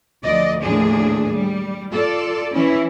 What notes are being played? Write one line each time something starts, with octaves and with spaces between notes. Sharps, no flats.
D2 F3 D5 D#5
D#2 A2 F3 D4 G#4
G3
F4 A4 D5
E3 C#4 E4